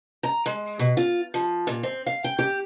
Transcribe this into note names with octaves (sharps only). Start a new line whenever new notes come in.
A#5
G#3
B2
F4
F3
A#2
C4
F5
G5
G4